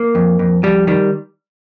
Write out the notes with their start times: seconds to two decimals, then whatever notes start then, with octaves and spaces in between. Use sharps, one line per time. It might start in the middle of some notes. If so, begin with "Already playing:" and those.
Already playing: A#3
0.15 F2
0.39 F2
0.63 F2 G3
0.87 D#3 G3